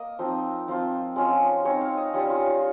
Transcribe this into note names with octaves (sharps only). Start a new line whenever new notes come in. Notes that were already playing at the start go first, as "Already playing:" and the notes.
Already playing: A#3 D#5
F3 C4 D#4
F3 C4 F4
G#3 C#4 F4
G#3 C4 D#4 C#5
F5
D#5
G3 C#4 F4 C#5
F4
F4